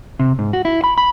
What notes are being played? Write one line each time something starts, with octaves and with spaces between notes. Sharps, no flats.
C3
G#2
F#4
E4
B5
B5